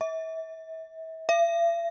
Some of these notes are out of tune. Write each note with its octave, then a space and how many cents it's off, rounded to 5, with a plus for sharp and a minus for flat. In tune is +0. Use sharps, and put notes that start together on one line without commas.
E5 -35
E5 +45